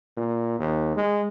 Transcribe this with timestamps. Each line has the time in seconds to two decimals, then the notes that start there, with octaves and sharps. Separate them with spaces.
0.17 A#2
0.59 D#2
0.96 G#3